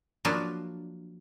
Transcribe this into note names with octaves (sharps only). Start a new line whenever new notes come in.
F3 F#3 A#3 D4 B4